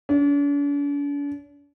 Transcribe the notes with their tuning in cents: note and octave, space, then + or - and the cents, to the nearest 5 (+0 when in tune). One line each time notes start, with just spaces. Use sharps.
D4 -45